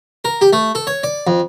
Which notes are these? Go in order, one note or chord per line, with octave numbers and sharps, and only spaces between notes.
A#4
G4
A3
A4
C#5
D5
F2